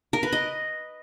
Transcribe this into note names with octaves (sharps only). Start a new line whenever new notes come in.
A#4
B4
D#5